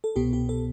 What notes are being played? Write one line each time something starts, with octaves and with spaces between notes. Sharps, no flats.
A4
C2 B2 B3 G4
G4
A4